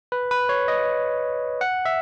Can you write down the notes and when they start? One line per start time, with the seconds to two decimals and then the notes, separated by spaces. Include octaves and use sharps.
0.12 B4
0.31 B4
0.49 C#5
0.68 D#5
1.61 F#5
1.85 E5